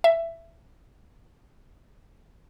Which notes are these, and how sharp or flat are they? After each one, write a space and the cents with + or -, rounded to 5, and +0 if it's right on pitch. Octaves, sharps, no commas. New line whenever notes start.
E5 +15